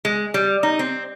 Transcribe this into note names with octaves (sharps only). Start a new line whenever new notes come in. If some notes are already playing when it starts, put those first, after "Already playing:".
G#3
G3
D#4
C4